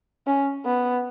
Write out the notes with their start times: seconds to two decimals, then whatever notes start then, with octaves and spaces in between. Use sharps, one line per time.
0.27 C#4
0.66 B3